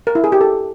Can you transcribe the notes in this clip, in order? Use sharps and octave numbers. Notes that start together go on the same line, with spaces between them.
A#4
E4
G#4
G4
A4